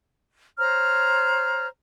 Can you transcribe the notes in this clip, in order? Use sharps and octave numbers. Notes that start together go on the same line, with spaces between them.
C5 C#5 A#5 F6